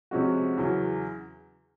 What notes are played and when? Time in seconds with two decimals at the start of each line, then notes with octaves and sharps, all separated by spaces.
0.11 C3 F3 G#3 C#4 F#4
0.58 E2 C#3 F#3